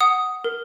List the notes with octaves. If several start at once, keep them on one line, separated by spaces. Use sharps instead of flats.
F#5 D#6
A#4